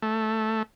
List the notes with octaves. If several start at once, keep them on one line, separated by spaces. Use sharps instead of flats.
A3